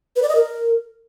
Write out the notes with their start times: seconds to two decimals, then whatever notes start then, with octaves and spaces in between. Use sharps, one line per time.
0.16 B4
0.22 D5
0.29 D#5
0.35 A#4